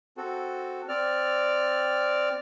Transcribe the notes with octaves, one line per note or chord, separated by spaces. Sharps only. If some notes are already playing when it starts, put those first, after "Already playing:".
C4 F#4 A4
C4 D5 F6